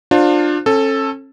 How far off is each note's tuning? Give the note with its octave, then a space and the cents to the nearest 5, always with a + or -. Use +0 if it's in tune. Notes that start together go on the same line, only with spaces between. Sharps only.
D4 +25 F4 +25 C5 +20
C#4 -35 A4 +0